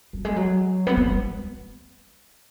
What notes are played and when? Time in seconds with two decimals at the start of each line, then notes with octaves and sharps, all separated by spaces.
0.13 F#3
0.25 G#3
0.36 F#3
0.87 B3
0.97 A#3
1.07 G#3